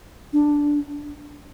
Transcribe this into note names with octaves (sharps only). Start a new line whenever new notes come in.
D4